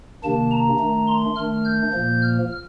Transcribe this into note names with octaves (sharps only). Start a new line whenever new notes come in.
C3 D#3 A#3 D4 A5
A#5
D#3 A3 D4
C6
D#3 A3 D4 F6
G6
A#2 F3 A#3
F6